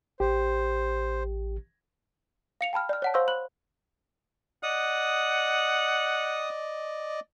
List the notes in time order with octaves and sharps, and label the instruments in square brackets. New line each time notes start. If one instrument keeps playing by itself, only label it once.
[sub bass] A1 [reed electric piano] G4 [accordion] C5
[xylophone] F5 C#7 F7
G5 A5 B5 F6
D5 F6
C#5 F#5 A5
C5 F5 C6 C#6 E6 G6
B5 F#6 F#7
[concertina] D5 D#5 [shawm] F#5 [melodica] D#6